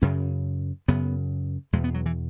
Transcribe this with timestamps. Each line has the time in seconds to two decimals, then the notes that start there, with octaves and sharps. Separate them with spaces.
0.02 F#2 C#3 C#4
0.88 F#2 C#3 B3
1.73 E2 B2 G#3
1.84 B3
1.94 F#3
2.06 E3